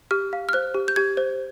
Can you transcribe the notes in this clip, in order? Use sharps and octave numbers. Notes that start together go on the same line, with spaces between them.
G4 F6
F5
F6
C5 F#6
G4
G6
G4 G#6
C5